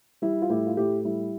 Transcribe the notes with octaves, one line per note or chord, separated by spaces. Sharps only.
G3 E4
F4
A2 E4 G4
F4
A2 E4 G4
G3 E4